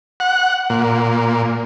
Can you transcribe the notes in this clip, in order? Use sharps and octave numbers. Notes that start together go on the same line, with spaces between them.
F#5
A#2